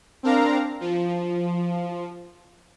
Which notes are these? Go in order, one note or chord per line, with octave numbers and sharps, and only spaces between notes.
C4 D4 A#4 F5 A#5
F3